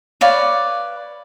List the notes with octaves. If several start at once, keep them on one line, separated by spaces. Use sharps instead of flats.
B4 C#5 D5 F5